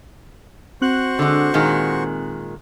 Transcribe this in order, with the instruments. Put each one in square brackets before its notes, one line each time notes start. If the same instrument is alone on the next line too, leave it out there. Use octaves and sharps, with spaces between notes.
[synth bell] C4 F#6 F#7 [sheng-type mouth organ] F#4 C5 C#6
[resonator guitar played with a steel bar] D3 G#3
A#2 D#3 G#3